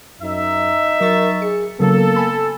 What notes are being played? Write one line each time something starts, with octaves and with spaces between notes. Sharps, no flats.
F#2 D#4 E5
F#3 A#4 C#6 A6
G#4 C#7
C#3 F#3 A#3 B3 A4
G#5 B5